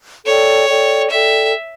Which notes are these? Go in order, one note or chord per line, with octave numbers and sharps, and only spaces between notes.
A4 C#5 D5 G5
A4 D5 G5
A4 D5 E5 G5